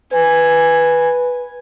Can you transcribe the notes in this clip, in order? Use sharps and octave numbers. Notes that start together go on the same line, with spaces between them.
B4 G#5